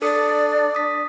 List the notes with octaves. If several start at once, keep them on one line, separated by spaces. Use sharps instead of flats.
D4 A4 D5 D#6 C#7
D#6 B6